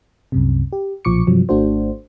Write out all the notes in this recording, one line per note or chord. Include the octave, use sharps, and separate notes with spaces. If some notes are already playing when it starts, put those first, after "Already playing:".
C2 F#2 C3
G4
B1 A#2 F3 C#6 D6 C#7
G2 C3 F3 F#3
G#1 A3 D4 F#4 C5